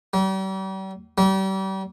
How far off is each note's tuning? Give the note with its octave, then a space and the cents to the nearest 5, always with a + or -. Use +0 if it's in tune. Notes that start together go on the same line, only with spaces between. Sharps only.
G3 -40
G3 -35